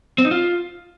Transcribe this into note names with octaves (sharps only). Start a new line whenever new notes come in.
C4
D#4
F4